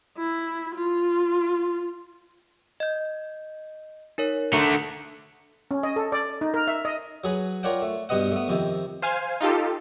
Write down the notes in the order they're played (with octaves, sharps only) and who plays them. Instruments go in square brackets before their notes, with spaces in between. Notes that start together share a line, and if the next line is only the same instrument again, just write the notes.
[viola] E4
F4
[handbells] D#5 G6
D#4 A#4 C#5
[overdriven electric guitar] D3 A3 [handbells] A#5
[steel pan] C#4
D#5
A4
D5
D#4
A#4
E5
D#5
[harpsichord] F#3 G#4 B4
F4 A#4 C#5 D5 F#5 G5
A3
G2 B2 B3 D#5 F#5
A3 B3
F2 C3 D#3
[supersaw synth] C5 F5 G#5
D#4 F4 G4 A4